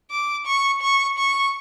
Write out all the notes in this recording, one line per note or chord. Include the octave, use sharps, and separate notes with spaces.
D6
C#6
C#6
C#6